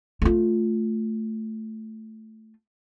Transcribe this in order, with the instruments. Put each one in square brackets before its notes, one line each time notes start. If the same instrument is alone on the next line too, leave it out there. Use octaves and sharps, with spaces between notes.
[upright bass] A3 F4